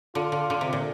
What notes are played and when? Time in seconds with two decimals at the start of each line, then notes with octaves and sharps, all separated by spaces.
0.15 D3 F4
0.32 D3
0.50 D3
0.61 C3
0.73 A#2